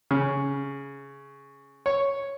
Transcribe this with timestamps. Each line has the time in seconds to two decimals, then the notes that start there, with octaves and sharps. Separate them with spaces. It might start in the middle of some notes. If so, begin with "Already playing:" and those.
0.11 C#3
1.86 C#5